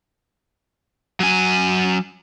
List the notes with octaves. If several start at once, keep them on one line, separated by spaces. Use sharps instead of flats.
F#3 G#5